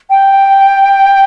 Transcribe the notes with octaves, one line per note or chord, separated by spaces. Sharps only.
G5